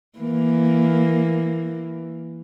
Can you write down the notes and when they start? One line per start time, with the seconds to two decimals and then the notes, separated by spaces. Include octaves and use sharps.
0.18 E3 A#3